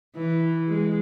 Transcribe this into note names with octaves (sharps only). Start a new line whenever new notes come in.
E3
G#3